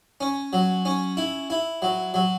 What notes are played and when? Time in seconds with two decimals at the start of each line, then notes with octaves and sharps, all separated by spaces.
0.21 C#4
0.53 F#3
0.85 C#4
1.17 E4
1.50 E4
1.82 F#3
2.14 F#3